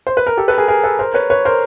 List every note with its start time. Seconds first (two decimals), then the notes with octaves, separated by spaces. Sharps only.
0.07 C5
0.17 B4
0.27 A#4
0.37 G4 A4
0.48 A4 B4
0.58 G#4 A#4
0.68 G#4 A#4
0.83 A4 B4
0.99 A#4 C5
1.14 B4 C#5
1.30 B4 C#5
1.45 A#4 C5